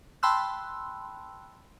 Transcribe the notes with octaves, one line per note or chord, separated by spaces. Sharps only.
G5 A5 B5 C6 E6 F#6